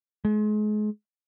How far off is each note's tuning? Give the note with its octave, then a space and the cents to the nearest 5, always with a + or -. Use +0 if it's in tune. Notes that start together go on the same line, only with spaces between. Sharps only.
G#3 +35